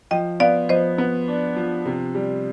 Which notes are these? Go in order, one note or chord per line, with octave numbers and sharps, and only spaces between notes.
F3 D#5 G5
B3 D5 F5
F3 C5 D#5
B3
D4
F3
C3
G3